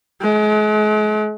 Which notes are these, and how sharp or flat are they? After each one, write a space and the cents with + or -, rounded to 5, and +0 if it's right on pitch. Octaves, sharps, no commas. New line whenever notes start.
G#3 +40